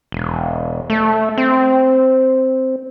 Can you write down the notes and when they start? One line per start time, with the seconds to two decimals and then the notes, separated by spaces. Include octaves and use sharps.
0.12 E1
0.90 A3
1.38 C4